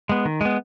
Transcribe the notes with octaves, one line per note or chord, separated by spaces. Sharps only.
G#3 B3
D#3
G#3 B3